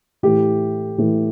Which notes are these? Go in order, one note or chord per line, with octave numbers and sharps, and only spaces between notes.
A2 E3 G4
A2 E3